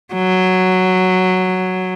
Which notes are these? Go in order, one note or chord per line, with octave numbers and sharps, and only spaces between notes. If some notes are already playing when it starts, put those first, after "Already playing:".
F#3